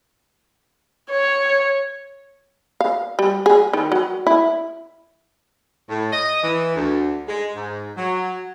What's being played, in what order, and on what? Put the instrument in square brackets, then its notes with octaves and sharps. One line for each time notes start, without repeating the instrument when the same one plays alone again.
[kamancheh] C#5
[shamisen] F5
G3
G#4
D#3
F#3
E4
[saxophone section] A2
D#5
E3
D2
G#3
G#2
F#3